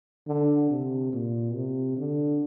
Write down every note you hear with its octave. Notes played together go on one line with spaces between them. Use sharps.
D3
C3
A#2
C3
D3